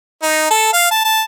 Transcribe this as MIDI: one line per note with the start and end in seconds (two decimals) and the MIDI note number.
0.22 0.50 63
0.51 0.72 69
0.73 0.90 77
0.91 1.03 81
1.05 1.22 81